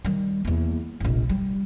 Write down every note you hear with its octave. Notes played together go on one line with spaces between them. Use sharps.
D#3 G3
E2 A#3
F1 A#1
G3